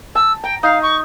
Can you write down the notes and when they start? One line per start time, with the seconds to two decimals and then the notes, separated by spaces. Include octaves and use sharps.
0.15 A5 E6
0.43 G5 A#5
0.63 D#4 F5
0.83 C#6